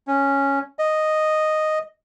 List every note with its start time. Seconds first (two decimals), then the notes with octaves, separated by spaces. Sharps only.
0.07 C#4
0.79 D#5